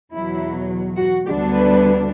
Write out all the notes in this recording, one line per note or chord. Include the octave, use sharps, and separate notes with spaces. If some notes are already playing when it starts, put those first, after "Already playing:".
E2 B2 F#3 E4
F#4
D2 D3 G3 B3 D4 G4
B4